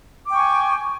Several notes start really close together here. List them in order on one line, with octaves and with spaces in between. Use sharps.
D6 G5 C#6 G#5